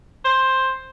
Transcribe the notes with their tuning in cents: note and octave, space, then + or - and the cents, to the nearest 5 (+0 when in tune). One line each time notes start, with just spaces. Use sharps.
C5 +10